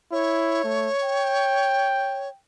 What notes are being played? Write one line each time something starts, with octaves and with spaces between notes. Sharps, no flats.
E4 C#5
A3
G5